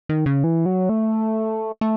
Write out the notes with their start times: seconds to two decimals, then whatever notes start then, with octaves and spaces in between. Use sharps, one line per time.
0.09 D#3
0.26 C#3
0.44 E3
0.66 F#3
0.89 A3
1.81 A3